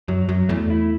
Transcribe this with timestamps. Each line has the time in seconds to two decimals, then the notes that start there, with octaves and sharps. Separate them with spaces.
0.08 F#2 F#3
0.29 F#2 F#3
0.49 E2 A3
0.70 E4